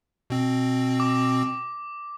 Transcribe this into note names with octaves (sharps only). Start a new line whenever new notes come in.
B2 C4
D6